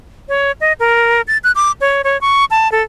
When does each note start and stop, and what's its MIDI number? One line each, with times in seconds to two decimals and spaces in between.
0.29 0.52 73
0.61 0.73 75
0.80 1.22 70
1.28 1.38 93
1.44 1.52 90
1.55 1.72 86
1.81 2.02 73
2.04 2.20 73
2.21 2.45 85
2.51 2.70 81
2.72 2.82 69